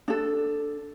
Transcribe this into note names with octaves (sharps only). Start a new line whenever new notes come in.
D4 A4